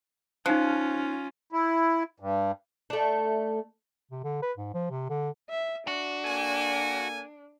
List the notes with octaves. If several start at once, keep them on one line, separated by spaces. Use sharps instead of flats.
F3 C#4 D#4 F4 F#6
E4
G2
A3 D4
C3
D3
B4
G#2
F3
C3
D3
E5
D4 F#4
A#3 A4 G#5